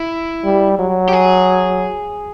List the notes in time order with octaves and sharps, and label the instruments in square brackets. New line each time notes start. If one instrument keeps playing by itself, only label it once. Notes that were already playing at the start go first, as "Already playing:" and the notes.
Already playing: [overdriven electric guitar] E4
[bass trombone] G3
F#3
[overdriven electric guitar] G4
G#4